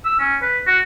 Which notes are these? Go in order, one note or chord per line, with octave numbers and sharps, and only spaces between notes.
E6
C#4
B4
F#4